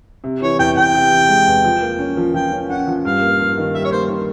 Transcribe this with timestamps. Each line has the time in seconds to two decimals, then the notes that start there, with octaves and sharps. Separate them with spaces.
0.24 C3
0.42 E3 C#5
0.59 E2 G5
0.77 E2 G5
0.95 C3
1.11 E3
1.29 G#3
1.47 E2
1.64 F3
1.82 A#3
1.99 C#4
2.17 F3
2.34 F3 G5
2.52 C#4
2.69 C#4 F#5
2.87 F3
3.04 G2 F5
3.21 A#3
3.39 G2
3.57 D#3
3.74 G3 E5
3.85 C#5
3.92 A#3 C5
4.09 D#3